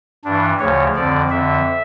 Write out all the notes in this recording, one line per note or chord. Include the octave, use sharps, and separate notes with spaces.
G2 E3 D4
D2 C#3 F3 C#5
F2 D3 F3 D5
F2 D3 F3 E5